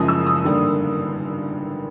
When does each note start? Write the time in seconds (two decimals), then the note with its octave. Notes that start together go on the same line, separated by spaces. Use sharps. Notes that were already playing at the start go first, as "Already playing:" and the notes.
Already playing: F#1 F#2 C#3 F3 G#3 D#6
0.08 E6
0.27 D#6
0.44 G#1 G2 D3 G3 A#3